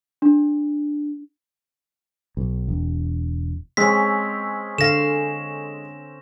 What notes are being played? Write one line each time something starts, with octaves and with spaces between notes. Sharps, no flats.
D4
B1
E1
G#3 C4 C#4 B6
D3 F5 A#6 E7